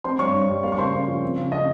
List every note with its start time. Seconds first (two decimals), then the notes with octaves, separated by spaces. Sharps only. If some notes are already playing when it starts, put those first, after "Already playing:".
0.04 C4 C5 C6
0.19 G2 C#5 C#6
0.34 G2
0.49 G3
0.63 A#3 F5
0.72 C#6
0.78 C#3 C5 C6
0.92 C#4
1.08 F3
1.22 C4
1.37 C#3
1.52 C#3 D#5 D#6